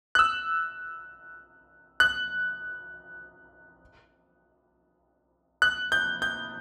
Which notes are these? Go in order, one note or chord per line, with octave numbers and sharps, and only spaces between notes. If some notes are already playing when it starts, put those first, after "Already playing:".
F#6
E6
F#6
F#6
G6
G6